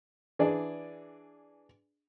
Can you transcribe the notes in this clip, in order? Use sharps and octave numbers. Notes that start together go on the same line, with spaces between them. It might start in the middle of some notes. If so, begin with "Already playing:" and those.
E3 D4 G#4 D5